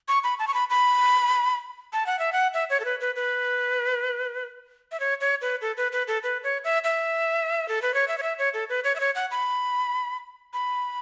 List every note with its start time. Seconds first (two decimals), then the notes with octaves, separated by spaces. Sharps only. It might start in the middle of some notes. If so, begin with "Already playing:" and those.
0.08 C#6
0.24 B5
0.39 A5
0.48 C#6
0.54 B5
0.70 B5
1.93 A5
2.06 F#5
2.19 E5
2.33 F#5
2.54 E5
2.70 C#5
2.80 A4
2.85 B4
3.01 B4
3.16 B4
4.92 E5
5.00 C#5
5.21 C#5
5.41 B4
5.61 A4
5.77 B4
5.92 B4
6.08 A4
6.23 B4
6.44 C#5
6.64 E5
6.84 E5
7.69 A4
7.82 B4
7.94 C#5
8.08 E5
8.18 C#5
8.23 E5
8.39 C#5
8.54 A4
8.69 B4
8.84 C#5
8.96 E5
9.00 C#5
9.15 F#5
9.31 B5
10.53 B5